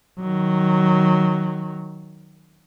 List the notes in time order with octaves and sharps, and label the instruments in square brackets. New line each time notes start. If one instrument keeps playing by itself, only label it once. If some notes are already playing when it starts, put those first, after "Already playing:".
[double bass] D#3 F#3